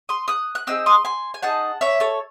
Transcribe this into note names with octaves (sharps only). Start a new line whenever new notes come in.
C6 D#6
D#6 F#6
F#6
C4 D#4 G#4 E6
C6 D#6
G#5 C6
G#5
D#4 G#4 F#5 A5
C#5 E5
A4 C#5